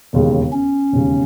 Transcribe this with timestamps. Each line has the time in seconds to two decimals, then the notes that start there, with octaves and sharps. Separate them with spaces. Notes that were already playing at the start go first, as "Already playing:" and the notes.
0.13 E1 D#2 C#3 G#3
0.53 C#4
0.92 E1 D#2 C#3 G#3